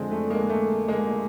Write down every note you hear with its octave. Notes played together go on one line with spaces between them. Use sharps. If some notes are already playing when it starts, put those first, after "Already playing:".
Already playing: F2 D3 G#3 C4 D4
A3
G#3 A#3
A3
G#3 A#3